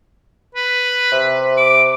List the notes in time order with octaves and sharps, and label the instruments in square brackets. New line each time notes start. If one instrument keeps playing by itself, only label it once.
[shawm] B4
[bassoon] C3
[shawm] D6